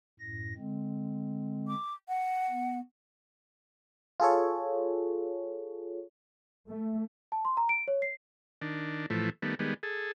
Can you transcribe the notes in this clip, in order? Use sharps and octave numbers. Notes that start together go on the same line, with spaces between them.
F#2 A2 A#6
D3 G#3 C4
D6
F#5
B3
F4 G#4 A4 C#5
A3
A5
C6
A#5
D7
C#5
C7
D#3 D4
A2 E3 F3 A3
D#3 G3 A3 B3
D#3 G3 G#3 B3
G#4 A4